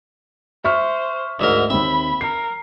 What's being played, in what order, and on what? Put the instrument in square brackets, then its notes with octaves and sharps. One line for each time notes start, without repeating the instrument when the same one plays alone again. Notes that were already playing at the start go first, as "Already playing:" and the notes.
[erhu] C5 [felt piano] E5 C#6 F6
[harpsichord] D2 G#2 A#4 [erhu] E5
[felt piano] D#2 C4 [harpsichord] E5 [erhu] B5
[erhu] A#4 [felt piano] C7